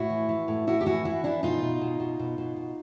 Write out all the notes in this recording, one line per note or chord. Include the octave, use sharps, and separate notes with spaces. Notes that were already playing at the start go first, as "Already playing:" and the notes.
Already playing: A2 E4 F#4
E3
E3
A2
A2 E4 F#4
G4
E3 E4 F#4
E3 E4 F#4
E3 D4 E4
B2 D#4 F4
B2
B2
B2
B2
B2
B2